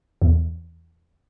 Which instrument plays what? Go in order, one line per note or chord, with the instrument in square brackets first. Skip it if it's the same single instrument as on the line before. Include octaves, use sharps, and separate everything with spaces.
[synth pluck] E2